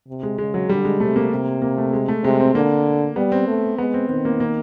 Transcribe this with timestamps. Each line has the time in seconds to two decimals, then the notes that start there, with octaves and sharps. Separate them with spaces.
0.08 C3
0.23 G#3
0.38 C#3 G#3
0.54 F#3
0.69 D3 G3
0.85 G#3
1.00 C3 A3
1.16 A#3
1.31 C3
1.62 A#3
1.78 A3
1.93 G#3
2.08 A3
2.23 C3 G#3
2.40 C4
2.55 D3 A#3
3.16 G3 B3
3.32 C4
3.47 A3
3.78 G#3 B3
3.94 C4
4.09 D#3 C4
4.25 A#3
4.40 A#3